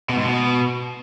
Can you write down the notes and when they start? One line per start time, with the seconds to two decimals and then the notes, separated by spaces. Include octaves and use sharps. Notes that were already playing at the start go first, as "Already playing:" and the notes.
0.09 B2
0.17 G#2
0.25 B2